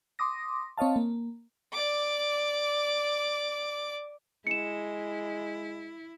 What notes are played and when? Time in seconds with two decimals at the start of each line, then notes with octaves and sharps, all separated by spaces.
0.19 C6 D6 D#6 A#6
0.78 C4 C#5 D#5 F5 A5
0.96 A#3
1.72 D5 D6
4.47 G#3 E4 C#7 E7